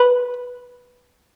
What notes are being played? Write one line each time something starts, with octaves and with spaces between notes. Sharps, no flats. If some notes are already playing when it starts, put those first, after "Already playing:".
Already playing: B4